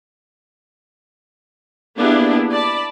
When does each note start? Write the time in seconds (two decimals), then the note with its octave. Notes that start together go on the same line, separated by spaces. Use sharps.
1.96 A#3 B3 D4 E4 G4 G#4
2.52 D5 A5 B5